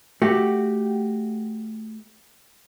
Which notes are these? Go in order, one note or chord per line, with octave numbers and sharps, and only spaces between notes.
A3 F#4 G4